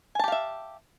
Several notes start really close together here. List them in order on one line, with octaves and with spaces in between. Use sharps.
G#5 A5 G4 F5 E5